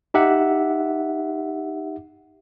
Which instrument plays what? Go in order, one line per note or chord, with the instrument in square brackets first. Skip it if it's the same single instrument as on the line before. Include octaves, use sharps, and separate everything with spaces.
[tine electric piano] D#4 G4 E5 F#5